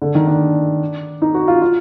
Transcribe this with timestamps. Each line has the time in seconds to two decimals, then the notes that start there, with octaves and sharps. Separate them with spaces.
0.02 D3
0.15 D#3
0.27 D4
1.22 D#4
1.34 F#4
1.48 F4
1.62 F4